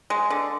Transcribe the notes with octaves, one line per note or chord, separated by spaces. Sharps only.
G#3
D3